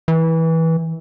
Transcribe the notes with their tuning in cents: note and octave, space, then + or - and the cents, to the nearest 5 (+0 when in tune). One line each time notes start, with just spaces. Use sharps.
E3 -20